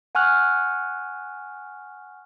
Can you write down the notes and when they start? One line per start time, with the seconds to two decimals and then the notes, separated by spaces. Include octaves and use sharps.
0.15 F#5 G#5 C#6 F6 F#6